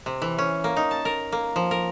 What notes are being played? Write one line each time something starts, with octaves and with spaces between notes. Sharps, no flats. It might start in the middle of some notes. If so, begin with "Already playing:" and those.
C3
E3
C#4
A#3
D#4
A5
A#4
A#3
F3
A#4